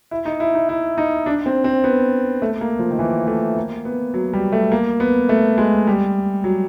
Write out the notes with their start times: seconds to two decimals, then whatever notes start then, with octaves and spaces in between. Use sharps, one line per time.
0.11 E4
0.25 D#4
0.40 E4
0.54 D#4
0.69 E4
0.98 D#4
1.26 D4
1.46 C4
1.64 C4
1.84 B3
2.42 A3
2.61 A#3
2.79 F3
2.91 D#3
2.99 E3
3.27 A3
3.56 A#3
3.85 B3
4.14 F#3
4.33 G3
4.52 A3
4.72 A#3
5.00 B3
5.29 A3
5.58 G#3
5.87 G3
6.44 F#3